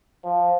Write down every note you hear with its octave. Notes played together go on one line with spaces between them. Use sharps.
F3